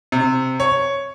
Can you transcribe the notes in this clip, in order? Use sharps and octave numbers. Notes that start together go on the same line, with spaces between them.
C3
C#5